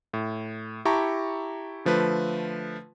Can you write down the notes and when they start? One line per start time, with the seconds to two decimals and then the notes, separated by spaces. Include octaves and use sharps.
0.14 A2
0.85 E4 G4 A5 A#5 C#6
1.85 D3 F3 A3 B4